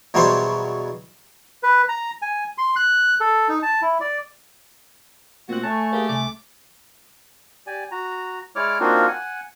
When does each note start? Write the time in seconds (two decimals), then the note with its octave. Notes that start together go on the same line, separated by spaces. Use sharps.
0.14 E2 B2 F#3 G3 C5
1.63 B4
1.89 A#5
2.22 G#5
2.58 C6
2.76 F#6
3.20 A4
3.49 D#4
3.63 A5
3.82 E4
4.01 D5
5.49 A#2 A3 C4 F#4 F#6
5.63 A3 C#5 G#5 A5
5.93 A#3 G4 G#4
6.09 C2 D6
7.67 G4 D5 G#5
7.91 F#4 A#5
8.56 G#3 E4 C#5 D5 D6 F6
8.80 A#3 C4 D4 D#4 F4 F#4
9.07 F#5 G#5